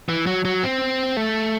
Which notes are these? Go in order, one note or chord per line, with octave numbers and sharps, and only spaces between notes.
E3
F#3
F#3
C4
A3